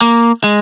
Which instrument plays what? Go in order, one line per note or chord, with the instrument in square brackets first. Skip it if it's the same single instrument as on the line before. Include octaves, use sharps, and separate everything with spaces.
[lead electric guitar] A#3
G#3